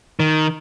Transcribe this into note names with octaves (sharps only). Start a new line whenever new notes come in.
D#3